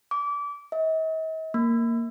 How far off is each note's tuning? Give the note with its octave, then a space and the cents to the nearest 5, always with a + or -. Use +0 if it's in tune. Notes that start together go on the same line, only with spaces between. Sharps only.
D6 -25
D#5 +45
A#3 -10